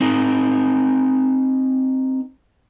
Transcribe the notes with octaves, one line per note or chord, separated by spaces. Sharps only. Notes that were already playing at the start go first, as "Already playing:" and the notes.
C4 D#4 A#4